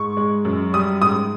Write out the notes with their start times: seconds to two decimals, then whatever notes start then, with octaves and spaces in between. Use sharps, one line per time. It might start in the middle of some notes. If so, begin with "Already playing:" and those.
Already playing: G#2 C#6
0.17 G#3
0.45 F#2
0.73 G3 D#6
1.01 G#2 D#6